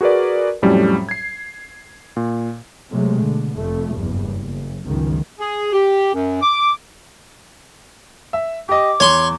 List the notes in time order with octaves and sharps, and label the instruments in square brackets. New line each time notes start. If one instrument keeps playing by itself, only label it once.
[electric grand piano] F#4 G#4 A#4 B4 D5
F2 A2 F#3 G3 C#4
G#6 C7
A#2
[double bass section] C3 F#3 G#3 A3
B2 D3
F1 F2 A3
F#1 E2 G2
F#1
G1 C#2 F#2 D#3
[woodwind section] G#4
G4
F#2
D6
[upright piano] E5
[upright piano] G4 D#5 [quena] D6
[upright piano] E2 [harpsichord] C#5 C6 C#6